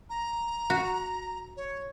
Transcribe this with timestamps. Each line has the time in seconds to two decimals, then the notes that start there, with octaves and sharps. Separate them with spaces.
0.09 A#5
0.70 F#4
1.57 C#5